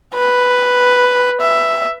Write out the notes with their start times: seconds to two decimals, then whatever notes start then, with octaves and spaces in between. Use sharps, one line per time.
0.14 B4
1.41 E5